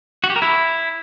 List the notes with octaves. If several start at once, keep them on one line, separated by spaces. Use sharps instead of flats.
F#4
G4
A#4
E4